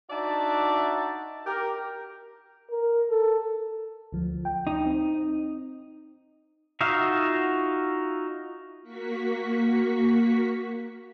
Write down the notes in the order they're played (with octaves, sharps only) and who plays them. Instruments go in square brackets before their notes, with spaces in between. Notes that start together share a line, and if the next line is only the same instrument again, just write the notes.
[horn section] D4 D#4 F#4 D5 E5 A5
G4 A#4
[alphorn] A#4
A4
[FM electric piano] D2 F3
G5
[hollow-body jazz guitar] D#4
[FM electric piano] C4
[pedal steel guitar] D#4 F4 F#4 E5 F5
[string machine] A#3 F#4 C#6 B6